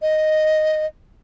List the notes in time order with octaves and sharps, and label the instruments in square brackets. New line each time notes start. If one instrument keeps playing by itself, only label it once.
[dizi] D#5